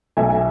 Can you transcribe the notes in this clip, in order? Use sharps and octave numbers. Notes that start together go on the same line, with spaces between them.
B1 B2 A3 E5 G#5